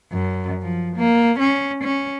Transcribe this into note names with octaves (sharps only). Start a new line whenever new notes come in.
F#2
F3
A#3
C#4
C#4